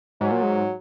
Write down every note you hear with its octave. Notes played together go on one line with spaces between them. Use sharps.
G#2 F#3
A#2
G#2